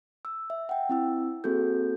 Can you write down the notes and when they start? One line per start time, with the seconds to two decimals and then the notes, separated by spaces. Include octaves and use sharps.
0.25 E6
0.50 E5
0.69 F#5 G5
0.89 C4 E4 E6
1.44 A#3 C4 F#4 G#4 A4 G6